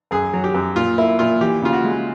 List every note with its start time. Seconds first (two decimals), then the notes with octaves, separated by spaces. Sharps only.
0.11 F#2 G#4
0.34 F#3
0.44 G4
0.54 F#2
0.76 A#2 F4
0.98 A#3 E4
1.19 A#2 F4
1.41 E3 G4
1.62 C#3 F4
1.73 F#4
1.84 G#3